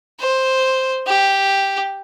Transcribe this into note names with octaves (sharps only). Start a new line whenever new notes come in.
C5
G4